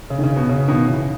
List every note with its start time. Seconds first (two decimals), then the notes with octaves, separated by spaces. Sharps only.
0.10 C#3
0.18 D#3
0.23 C#3
0.36 B2
0.49 C#3
0.68 B2 D#3
0.87 C#3 E3